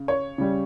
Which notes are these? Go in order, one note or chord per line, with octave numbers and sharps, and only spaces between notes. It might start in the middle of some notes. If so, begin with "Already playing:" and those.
Already playing: C#3
C#5
C#3 G3